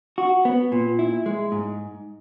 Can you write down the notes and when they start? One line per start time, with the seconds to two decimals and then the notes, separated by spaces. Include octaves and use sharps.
0.18 F#4
0.45 B3
0.72 A#2
0.99 E4
1.26 G#3
1.52 G#2